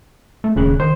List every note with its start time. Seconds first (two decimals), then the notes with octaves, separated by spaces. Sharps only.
0.44 A3
0.56 D1 D#2 C#3 F#6
0.80 D#3 C5